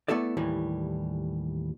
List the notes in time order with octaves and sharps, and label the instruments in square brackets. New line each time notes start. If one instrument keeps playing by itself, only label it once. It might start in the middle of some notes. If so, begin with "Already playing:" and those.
[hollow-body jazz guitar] A3 B3 E4 A4 D5
D#2 A2 E3 G3